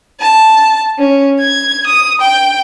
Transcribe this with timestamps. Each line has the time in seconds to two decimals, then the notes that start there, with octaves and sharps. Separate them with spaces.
0.20 A5
0.98 C#4
1.39 G#6
1.86 D#6
2.21 G5